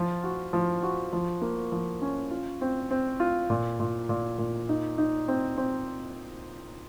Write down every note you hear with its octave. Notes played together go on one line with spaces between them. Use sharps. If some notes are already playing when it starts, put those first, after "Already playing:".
Already playing: F3 F4
F#4
F3
F#4
F3
A#3
F3
C#4
F4
C4
C4
F4
A#2
A#2
A#2
A#2
D#4
D#4
C4
C4